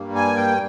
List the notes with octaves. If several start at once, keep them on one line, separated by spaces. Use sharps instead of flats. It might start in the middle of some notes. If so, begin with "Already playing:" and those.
Already playing: G2 G3 A#3
G#5
G5